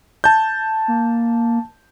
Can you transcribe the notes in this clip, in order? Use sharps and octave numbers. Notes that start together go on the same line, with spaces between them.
A5 G6
A#3